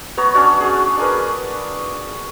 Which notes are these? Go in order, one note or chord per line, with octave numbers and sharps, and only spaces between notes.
B3 C#5 A#5 C#6
C#4 D4 F#4 C#5
F#4 G#4
D4 G#4 A#4 B4